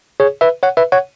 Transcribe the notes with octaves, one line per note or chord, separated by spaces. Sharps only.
G#4 C#5
B4 E5
C#5 F#5
B4 E5
C#5 F#5